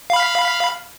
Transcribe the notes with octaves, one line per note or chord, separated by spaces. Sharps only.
F5 B5